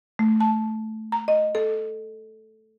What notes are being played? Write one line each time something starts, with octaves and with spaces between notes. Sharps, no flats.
A3
A5
A#5
D#5
A4